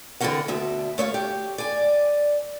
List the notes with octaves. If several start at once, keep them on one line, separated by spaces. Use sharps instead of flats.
D3 E3 C4 C#4 A#4 F#5
D2 B2 E5
A3 C#5 D5 F5
G4
D5 G#5